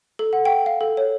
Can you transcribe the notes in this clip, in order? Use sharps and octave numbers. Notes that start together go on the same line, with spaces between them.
A4
F#5
G5
F5
A4
C#5